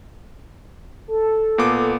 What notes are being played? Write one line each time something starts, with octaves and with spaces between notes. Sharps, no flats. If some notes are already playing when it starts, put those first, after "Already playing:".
A4
A#2 B3 D6